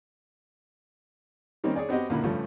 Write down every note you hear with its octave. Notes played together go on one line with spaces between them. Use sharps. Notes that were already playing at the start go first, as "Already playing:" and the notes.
D#3 G3 A#3 C4 C#4 D#4
G#4 C#5 D5 G#5
B3 C4 F#4 G4 D#5
C#2 A#2 D3 A#3 E4 B5
G2 C#3 F3 G3 A3